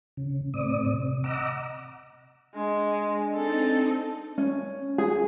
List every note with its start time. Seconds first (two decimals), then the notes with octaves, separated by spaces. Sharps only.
0.17 C#3
0.54 A2 C4 D5 D#6
0.94 C3
1.24 D#5 F#5 A#5 D6 E6
2.55 G#3 D4
3.35 C4 D#4 A4
4.38 C#4
4.98 G#4